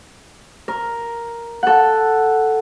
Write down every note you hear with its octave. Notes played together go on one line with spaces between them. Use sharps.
A#4
A4 F#5